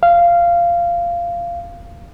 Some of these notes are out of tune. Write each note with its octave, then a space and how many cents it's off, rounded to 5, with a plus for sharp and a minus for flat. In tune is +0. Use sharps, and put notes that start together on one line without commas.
F5 -15